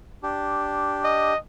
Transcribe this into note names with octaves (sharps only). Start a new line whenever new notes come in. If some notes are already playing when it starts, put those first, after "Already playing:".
D4 G4
D#5